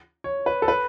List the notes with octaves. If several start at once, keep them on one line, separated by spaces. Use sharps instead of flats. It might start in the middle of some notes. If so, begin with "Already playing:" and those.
C#5
B4
A4
B4